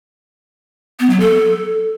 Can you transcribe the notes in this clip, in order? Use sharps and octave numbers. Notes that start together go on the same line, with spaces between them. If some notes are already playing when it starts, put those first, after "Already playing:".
B3
F#3
A4